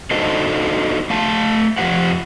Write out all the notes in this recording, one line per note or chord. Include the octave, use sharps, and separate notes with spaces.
D4 D#4 F#4 A4 C5 D#5
A3 F5 A5
F2 F3 F4 G4 C5 F#5